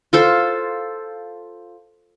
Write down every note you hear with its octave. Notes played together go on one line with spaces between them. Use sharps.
F4 A4 C5